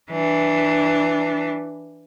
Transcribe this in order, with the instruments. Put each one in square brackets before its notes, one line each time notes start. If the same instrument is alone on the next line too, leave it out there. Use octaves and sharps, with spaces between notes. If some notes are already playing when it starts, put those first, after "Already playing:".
[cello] E3 D4